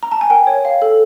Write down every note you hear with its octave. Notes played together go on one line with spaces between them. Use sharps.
A#5
A5
G#5
A#4 G5
C#5
F5
A4